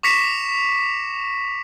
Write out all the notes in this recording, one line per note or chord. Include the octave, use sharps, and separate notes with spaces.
C#6 D6 A#6 B6 C#7 E7